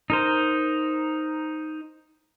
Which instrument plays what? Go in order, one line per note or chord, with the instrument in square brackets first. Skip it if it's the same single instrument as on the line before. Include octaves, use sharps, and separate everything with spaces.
[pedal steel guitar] D#4 A#4 C5